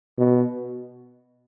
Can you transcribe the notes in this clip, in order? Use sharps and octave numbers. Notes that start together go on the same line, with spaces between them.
B2